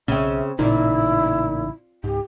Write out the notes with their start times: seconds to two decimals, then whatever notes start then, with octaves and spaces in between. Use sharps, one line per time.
0.08 B1 C#3 C4 C#4 E5
0.59 A1 A#2 C#3 D#4 E4
2.04 C#2 G#2 G4